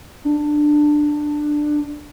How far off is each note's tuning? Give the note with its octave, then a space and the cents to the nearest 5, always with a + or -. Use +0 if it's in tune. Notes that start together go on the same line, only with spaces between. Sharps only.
D4 +15